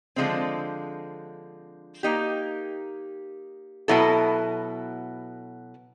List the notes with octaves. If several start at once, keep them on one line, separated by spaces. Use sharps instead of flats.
D3 F3 G#3 C4
A#3 D#4 G4
B2 F#3 B3 E4 A4